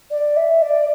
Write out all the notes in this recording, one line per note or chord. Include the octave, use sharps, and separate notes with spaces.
D5
E5
D5